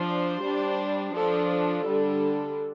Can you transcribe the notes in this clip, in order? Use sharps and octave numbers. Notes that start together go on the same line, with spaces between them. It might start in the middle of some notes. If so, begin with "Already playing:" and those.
Already playing: F3 D4 C5
G3 D4
F3 D4 A4
A4
D3 G3 D4